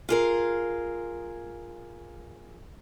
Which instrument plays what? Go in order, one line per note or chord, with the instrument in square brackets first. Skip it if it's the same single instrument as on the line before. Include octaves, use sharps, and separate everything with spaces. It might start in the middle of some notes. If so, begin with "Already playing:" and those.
[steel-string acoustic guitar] F4 G#4 A#4